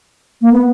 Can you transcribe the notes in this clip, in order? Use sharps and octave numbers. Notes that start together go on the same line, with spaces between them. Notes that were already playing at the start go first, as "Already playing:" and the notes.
A#3
B3